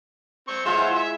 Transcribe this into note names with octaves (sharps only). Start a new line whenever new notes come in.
C4 C#6
G#3 F4 G#4 C5 C#5 E5
E4 F#5 G#5
E5